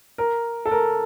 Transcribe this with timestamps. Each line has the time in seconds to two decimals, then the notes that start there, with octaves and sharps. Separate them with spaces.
0.18 A#4
0.65 A4
0.71 A#4